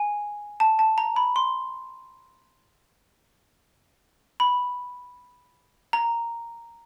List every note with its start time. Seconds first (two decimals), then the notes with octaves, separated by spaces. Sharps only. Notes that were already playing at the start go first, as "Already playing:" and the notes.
Already playing: G#5
0.60 A5
0.79 A5
0.98 A#5
1.16 B5
1.36 C6
4.40 B5
5.93 A#5